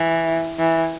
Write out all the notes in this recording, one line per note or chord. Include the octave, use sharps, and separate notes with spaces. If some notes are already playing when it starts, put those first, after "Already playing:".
Already playing: E3
E3